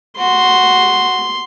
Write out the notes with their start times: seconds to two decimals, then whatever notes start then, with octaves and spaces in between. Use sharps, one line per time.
0.18 F#4 C6